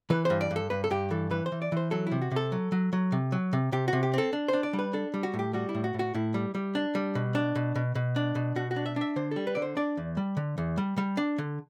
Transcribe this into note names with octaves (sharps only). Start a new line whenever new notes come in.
E3 B4
G2 C5
D5
G2
A4
G2 B4
A4
G2 G4
E3 A4
E3 B4
C5
E3
D5
E3 C5
F#3 A4
C3 E4
F#4
C3
A4
F#3
F#3
F#3
C3
F#3
C3
C3 G4
C3 F#4
G4
C4 A4
D4
D4 C5
D5
G3
B4
D4 A4
G3
F#4
A2
G4
G3 F#4
E4
A2
F#4
A2
F#4
A2 E4
G3
G3
D4
G3
B2
D4
B2
B2
B2
D4
B2
B2 F#4
F#4
D4
E5
D4 E5
D3 C5
G3 A4
B4
D3 D5
C5
D4 D5
E2
G3
D3
E2
G3
G3
D4
D3